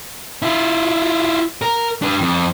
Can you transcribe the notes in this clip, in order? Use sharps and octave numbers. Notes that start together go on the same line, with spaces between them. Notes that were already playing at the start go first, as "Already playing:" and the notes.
E4 F4
A#4
D4 B4
F2